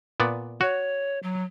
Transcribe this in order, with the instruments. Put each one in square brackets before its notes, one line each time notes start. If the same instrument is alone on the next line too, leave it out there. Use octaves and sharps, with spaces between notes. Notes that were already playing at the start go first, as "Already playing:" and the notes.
[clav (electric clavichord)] A#2 B3 D5
[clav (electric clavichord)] F#4 [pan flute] C#5
[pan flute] F#3